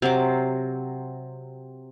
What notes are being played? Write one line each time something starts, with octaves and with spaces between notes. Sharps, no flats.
C3 F#3 C5 D6